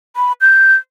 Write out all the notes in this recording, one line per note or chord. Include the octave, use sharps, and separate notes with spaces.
B5
G6